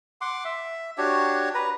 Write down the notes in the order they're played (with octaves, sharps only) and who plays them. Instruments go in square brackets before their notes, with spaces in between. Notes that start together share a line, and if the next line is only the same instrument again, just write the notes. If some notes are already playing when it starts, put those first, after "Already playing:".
[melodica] F#5 C6 D6
E5
D4 F#4 G4 C#5
B4 A#5